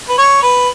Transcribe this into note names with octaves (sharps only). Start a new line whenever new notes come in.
B4
C#5
B4